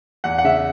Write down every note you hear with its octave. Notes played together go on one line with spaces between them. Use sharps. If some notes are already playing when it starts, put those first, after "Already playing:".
E2 F#5
F#5
C#3 E5